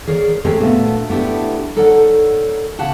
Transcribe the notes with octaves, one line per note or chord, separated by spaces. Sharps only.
G#4 A#4 C#5 D5 F5
G#3 A3 C4 G4 G#4 A#4
A#2 A3 B3 D4 F#4
A3 B3 D4 E4 G4
D#4 A4 A#4 C#5 D5 F#5
C#3 G4 F#5 A5